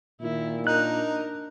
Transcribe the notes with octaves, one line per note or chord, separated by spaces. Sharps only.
A#2 D#3 E4
D4 D#4 A#4 F#6